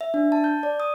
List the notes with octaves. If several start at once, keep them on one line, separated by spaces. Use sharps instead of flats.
E5
D4
A5
G6
D5
D#6